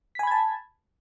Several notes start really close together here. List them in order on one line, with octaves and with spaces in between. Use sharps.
B6 G#5 B5 G#6 A5